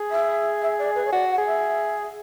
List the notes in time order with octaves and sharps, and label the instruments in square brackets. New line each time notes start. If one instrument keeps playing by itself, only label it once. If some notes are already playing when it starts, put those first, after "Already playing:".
Already playing: [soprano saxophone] G#4
[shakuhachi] E5
E5
D5
B4
C#5
[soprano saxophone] F#4 [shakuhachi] D5
[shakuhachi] F#5
[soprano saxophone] G#4
[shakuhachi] E5